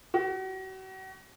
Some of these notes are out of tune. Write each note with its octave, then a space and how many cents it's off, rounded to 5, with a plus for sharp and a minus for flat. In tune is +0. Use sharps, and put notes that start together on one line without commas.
F#4 +40